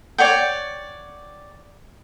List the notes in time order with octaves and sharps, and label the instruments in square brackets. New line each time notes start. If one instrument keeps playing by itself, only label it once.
[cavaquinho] C#5 D5 F#5 G5